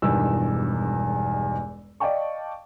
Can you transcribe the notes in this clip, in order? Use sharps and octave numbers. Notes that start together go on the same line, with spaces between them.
E1 E2 G2 B2 D#3 E6
D5 D#5 F5 G5 A5 C#6